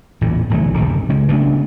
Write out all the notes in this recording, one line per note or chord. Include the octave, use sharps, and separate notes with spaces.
A1 E2 A#2
D1 B1 E3 A3
F#1 C#2 C3 D#3
C#3 G#3
C#3 A3 B3 D4